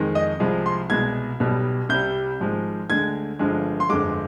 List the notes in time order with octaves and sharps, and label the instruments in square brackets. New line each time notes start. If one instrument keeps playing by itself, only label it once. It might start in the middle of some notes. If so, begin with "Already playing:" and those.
Already playing: [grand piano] F2 D#3 G#3
D#5
C2 C3 F3 G#3
C6
C2 B2 G#3 G#6
B1 B2 G3
C2 C3 G3 G6
G#1 G#2 F3 G#3
D2 D3 G#3 G#6
G1 G2 D3 F3 G#3
C6
G1 F2 D3 G#3 D6